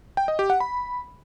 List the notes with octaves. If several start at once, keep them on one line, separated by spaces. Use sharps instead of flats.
G5
D#5
G4
F#5
B5